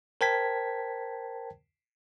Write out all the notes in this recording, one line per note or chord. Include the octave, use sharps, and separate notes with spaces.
A#4 C5 G5 A5 G#6 B6